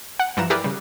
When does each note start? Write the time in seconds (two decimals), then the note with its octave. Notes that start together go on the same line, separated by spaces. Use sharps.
0.20 F#5
0.37 G2 E3 F3 A#5 E7
0.50 E4 G4 G#4 A#4 B4 D5
0.64 C#3 G3